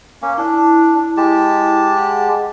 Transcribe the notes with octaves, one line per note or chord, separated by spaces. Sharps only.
A#3 C#4
D4 E4
G#3 G4 A5
G#4 F#5 G#5